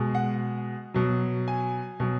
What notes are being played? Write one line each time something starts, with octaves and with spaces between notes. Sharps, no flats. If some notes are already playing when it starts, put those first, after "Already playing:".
Already playing: B2 G#3
F#5
B2 F#3
G#5
B2 F#3